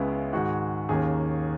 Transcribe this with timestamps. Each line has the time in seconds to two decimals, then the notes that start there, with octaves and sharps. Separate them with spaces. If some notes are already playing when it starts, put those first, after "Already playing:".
Already playing: C#2 C#3 G#3 B3 E4
0.33 G#2 D#3 G#3 F#4
0.89 D#2 D#3 A#3 C#4 G#4